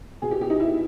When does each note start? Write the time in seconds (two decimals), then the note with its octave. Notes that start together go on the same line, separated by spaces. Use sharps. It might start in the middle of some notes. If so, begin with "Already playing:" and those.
0.22 B2 G#4
0.31 G4
0.41 G4
0.50 D#4
0.60 E4